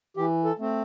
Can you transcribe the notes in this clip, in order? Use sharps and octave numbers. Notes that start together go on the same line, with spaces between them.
E3 G4
A4
A3 C4